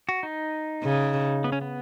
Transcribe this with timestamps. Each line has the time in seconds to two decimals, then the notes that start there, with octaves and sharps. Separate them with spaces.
0.09 F#4
0.23 D#4
0.84 C#3
1.44 B3
1.52 C#4
1.61 B3